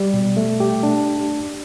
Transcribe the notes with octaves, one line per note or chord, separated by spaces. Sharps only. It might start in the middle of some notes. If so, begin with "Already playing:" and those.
Already playing: G3
B2
A3
G4
D4